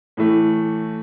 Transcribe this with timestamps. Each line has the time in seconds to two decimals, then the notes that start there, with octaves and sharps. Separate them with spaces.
0.17 A2 E3 A3